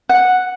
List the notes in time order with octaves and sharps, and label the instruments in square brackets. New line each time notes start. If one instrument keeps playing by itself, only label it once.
[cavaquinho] F#5